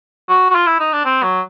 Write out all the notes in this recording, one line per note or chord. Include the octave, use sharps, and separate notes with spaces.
F#4
F#4
F4
E4
D#4
D4
C4
F#3